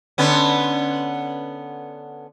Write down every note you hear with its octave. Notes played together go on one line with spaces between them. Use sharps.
D3 B3 C#4